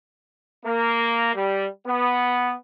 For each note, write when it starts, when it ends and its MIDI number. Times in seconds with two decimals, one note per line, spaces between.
0.65 1.33 58
1.33 1.65 55
1.86 2.54 59